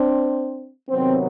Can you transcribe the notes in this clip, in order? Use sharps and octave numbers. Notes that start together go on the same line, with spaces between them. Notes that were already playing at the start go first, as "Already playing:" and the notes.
Already playing: C4 D4
C3 D#3 F#3 B3 C4